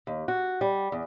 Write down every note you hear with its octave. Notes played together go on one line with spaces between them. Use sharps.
D#2
F#4
G3
E2